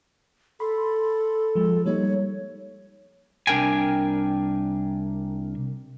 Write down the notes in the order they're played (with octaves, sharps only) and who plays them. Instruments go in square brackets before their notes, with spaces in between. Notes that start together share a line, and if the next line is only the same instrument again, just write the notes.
[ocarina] A4 [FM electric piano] B5 C6
[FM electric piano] F3 G#3
[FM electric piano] G3 A#3 D#4 [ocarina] C#5
[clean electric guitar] C2 D4 A#4 G5 G#5